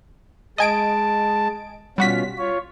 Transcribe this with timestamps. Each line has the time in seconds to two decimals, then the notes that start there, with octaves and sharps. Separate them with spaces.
0.58 G#3 D#5 G#5 A5 D7
1.98 B2 G3 C#4 F4 F#4 B6
2.38 F4 C#5